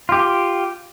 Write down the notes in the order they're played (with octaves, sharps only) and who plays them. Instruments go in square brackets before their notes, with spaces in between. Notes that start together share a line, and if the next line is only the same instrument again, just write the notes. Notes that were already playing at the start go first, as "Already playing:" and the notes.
[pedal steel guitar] F4 G4